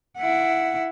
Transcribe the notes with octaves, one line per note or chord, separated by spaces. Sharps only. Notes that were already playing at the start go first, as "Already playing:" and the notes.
E4 F#5